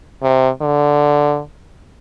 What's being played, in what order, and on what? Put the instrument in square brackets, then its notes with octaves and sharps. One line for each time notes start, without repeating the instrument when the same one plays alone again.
[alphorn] C3
D3